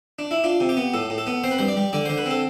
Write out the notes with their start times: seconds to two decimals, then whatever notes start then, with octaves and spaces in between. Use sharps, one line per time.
0.19 D4
0.31 E4
0.44 D4 F4
0.60 C3
0.69 G4
0.77 B3
0.94 A2 A4
1.10 A2
1.18 A4
1.27 B3
1.43 C4 C5
1.51 B4
1.58 G2 C5
1.68 D5
1.77 G3
1.93 D3 D5
2.06 D3 C5
2.18 B4
2.26 C4 A4